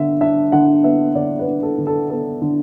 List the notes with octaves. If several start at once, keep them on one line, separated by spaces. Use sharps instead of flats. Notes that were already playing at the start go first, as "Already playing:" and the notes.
Already playing: D3 B3 E5
D4 E5
D3 F#5
B3 E5
D3 D5
B4
D4
A4
D3
A4
B3 A4
D3